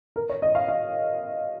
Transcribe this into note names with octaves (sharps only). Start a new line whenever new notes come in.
A#4
C#5
D#5
F5
F5